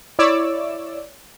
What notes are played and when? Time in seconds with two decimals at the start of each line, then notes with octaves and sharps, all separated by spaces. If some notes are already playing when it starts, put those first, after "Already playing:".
0.19 E4 C#5 D5 D6 E6